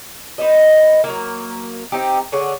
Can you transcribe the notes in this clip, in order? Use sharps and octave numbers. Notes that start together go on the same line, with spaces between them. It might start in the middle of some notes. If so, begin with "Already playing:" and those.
D#4 B4 C5 D#5
F#3 A#3
C4 D#4 G4
D3 G#4 C#5 F#5